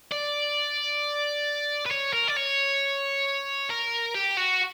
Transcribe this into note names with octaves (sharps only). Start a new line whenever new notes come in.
D5
B4
C#5
A#4
D5
C#5
A#4
G4
F#4